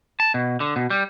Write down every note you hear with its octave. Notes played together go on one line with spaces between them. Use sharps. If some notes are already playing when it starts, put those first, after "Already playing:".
A5
B2
D3
B2
G3